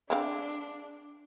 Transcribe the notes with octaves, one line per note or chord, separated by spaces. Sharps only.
G#3 C4 D4 F5